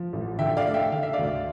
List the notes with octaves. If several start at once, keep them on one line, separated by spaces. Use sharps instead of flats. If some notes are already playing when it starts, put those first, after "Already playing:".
Already playing: F3
A1
D3 E5 G5
D5 F5
A3
E5 G5
D3 F5
E5
D5 F5
D2